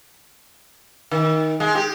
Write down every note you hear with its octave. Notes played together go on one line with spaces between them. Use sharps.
D#3
G#3
G4